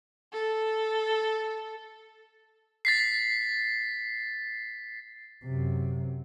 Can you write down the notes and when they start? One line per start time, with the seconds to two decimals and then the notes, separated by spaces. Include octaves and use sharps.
0.33 A4
2.85 A6 B6 C7
5.44 F#2 C3